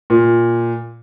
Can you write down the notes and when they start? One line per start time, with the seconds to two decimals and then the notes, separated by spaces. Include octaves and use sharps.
0.10 A#2